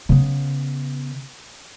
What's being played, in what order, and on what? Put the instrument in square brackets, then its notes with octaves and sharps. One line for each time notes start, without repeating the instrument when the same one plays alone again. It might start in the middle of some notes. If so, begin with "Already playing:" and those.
[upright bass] C#3 B3